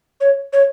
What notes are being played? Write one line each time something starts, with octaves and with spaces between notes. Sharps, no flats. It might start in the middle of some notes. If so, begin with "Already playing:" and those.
C#5
C#5